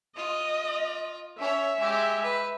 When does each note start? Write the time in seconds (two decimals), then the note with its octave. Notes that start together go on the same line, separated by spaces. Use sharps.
0.17 F4 D#5
1.39 C#4 C#5 E5
1.80 G#3 G4
2.24 B4